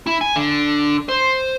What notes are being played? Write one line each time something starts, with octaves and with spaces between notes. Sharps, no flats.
E4
G#5
D3
C5